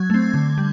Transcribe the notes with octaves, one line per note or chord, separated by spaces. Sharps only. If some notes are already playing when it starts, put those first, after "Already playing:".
Already playing: F#3 G#6
A3 C4
D3
G3